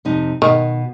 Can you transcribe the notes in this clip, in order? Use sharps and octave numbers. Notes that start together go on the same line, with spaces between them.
F2 C3 D#4
B2 D#3